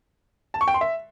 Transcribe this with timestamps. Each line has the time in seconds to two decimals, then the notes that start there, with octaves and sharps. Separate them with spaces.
0.54 A5
0.61 C#6
0.68 G5
0.74 C6
0.81 E5